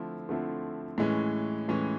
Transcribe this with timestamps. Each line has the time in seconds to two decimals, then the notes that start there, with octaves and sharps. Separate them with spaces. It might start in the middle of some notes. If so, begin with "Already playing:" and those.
Already playing: D3 F3 A3 C4 E4
0.29 D3 F3 A3 C4 E4
0.98 A2 E3 G#3 C#4
1.68 A2 E3 G#3 C#4